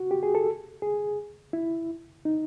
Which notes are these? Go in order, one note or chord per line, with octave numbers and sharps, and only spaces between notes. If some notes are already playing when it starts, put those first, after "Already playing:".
Already playing: F#4
G4
G#4
A4
G#4
E4
D#4